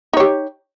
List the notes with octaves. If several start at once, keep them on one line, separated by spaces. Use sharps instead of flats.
D#4 G4 C#5